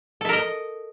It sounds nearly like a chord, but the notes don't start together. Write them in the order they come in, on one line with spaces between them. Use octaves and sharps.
A4 E5 A#4 D#5